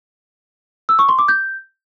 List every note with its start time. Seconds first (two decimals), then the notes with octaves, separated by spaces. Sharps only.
0.89 E6
0.99 C#6
1.09 C6
1.19 D6
1.28 G6